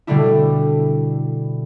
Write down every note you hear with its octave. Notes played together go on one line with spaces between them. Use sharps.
B2 D3 G3 A3 D4 E4